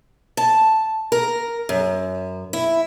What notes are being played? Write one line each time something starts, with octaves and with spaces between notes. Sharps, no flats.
A5
A#4
F#2
E4